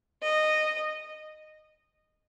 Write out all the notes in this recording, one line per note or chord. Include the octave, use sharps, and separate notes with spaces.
D#5